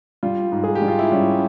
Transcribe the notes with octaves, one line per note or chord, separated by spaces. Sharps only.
G3 F4
G#2
G#4
G4
G3
F4
E4
G3 C#4